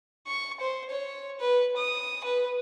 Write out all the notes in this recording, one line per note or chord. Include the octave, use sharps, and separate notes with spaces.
C#6
C5
C#5
B4
D#6
B4